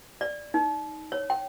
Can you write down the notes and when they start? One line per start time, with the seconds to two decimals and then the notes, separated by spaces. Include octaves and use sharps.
0.21 D5
0.54 D#4
1.12 C#5
1.30 G5